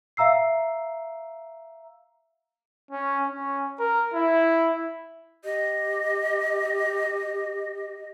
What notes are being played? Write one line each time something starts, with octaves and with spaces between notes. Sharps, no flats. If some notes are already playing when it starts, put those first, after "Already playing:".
E5 F5 A#5 E6 C7
C#4
C#4
A#4
E4
G4 D#5